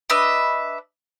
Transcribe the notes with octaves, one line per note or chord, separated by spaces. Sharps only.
D4 B4 D#5 E5